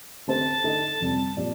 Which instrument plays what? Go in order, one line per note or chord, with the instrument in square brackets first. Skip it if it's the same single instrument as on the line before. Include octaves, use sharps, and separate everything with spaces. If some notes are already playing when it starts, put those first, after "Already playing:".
[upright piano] D3 A3 C4 G4 C5 [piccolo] A5
[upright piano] D3 A3 D#4 A4 D#5
F2 C3 G3 C4
A#2 F3 C4 G4 D5